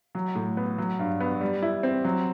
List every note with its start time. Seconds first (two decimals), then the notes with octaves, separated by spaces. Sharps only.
0.15 F#3
0.35 A2
0.57 B3
0.78 F#3
0.99 G2
1.20 B3
1.41 G3
1.62 E4
1.83 C4
2.04 F#3